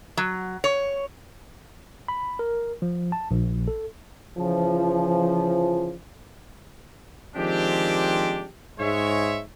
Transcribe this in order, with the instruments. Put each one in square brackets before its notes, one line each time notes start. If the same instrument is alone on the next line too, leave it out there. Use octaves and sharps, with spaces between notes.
[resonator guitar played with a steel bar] F#3
C#5
[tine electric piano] B5
A#4
F3
A5
A#1
A4
[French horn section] C#3 E3 F3
[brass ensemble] D#3 F3 G#3 C4 D4 G4
G#2 G#3 C#5 E5